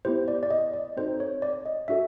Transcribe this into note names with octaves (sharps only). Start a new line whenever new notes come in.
B3 E4 G4 C5
D5
D5
D#5
D5
C4 D#4 F#4 A4 C5
C#5
D5
D#5
D4 F#4 A4 E5